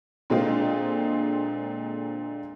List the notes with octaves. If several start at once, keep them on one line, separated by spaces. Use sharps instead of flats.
A#2 D3 G#3 C4 F4